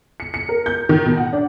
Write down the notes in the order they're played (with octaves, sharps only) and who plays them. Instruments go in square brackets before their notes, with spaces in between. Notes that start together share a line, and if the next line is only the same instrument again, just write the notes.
[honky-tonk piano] C#7
C#7
A#4
G6
D#3
B2
F#5
D4